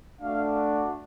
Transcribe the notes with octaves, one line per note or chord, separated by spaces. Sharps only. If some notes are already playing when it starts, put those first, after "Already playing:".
A3 D4 F#4 F5